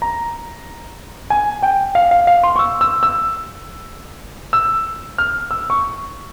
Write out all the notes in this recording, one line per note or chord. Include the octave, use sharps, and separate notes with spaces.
A#5
G#5
G5
F5
F5
F5
C6
C#6
E6
E6
E6
E6
F6
E6
C#6